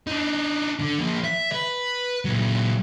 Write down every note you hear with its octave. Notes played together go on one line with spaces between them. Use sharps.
D4 D#4
D3 D4
F3 A#3
E5
B4
A#2 F#3